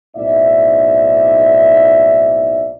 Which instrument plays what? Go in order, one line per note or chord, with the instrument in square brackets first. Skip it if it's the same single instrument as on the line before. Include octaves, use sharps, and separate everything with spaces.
[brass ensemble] B1 A2 C4 D#4 D5 E5